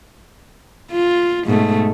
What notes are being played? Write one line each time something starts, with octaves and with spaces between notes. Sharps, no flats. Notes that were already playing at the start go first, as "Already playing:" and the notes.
F4
G#2 B2 A3